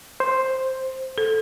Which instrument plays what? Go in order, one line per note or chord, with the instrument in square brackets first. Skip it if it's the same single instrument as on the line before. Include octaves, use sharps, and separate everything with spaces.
[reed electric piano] C5
[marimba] A4